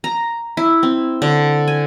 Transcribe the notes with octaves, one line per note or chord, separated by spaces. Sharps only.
A#5
E4
C4
D3
G#5